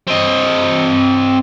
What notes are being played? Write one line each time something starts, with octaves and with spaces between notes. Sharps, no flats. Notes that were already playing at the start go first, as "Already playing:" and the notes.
C4 D#5